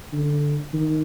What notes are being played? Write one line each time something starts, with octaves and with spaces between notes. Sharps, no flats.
D3
D#3